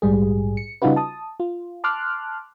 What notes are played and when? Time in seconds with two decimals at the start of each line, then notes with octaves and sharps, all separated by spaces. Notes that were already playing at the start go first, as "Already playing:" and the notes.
0.02 A#1 G#2 G3 G#4
0.57 C#7
0.82 C#3 G3 D#4 F4 F#4 B4
0.96 A5 D#6
1.40 F4
1.84 A5 C6 D6 F6 F#6